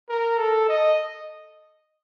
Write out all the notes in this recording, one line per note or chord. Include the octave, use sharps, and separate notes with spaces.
A#4
A4
D#5